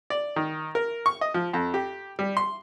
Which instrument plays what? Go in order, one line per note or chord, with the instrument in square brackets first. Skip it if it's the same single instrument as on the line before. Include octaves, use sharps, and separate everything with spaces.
[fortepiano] D5
D#3
A#4
C#6
D#5
F3
F2
G4
G3
C6